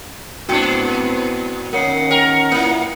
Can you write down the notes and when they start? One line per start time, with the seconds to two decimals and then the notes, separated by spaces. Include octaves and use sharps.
0.49 G#2 B3 C4 D4 F#4 G5 C#7
1.73 D#3 A#3 C#4 A#4 C#5 F#5 C7
2.11 A#4 G5
2.52 A#2 A#3 E4